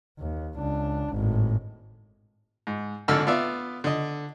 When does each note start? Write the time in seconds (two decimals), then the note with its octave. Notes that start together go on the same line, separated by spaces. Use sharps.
0.19 D#2
0.58 C#2 D4
1.11 G#1 A2
2.67 G#2
3.08 G#1 D3 A4 E6 F6
3.27 B3 F4 D5 E5
3.84 D3 D#5